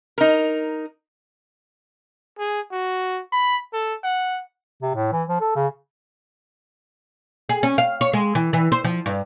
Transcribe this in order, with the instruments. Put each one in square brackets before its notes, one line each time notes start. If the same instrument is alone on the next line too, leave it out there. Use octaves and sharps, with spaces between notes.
[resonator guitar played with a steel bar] D#4 A#4
[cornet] G#4
F#4
B5
A4
F#5
[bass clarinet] C3
A2
E3
F3
A4
C#3
[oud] G#4
C#4
F5
C#5
G#3
E3
E3
C5
F3
G2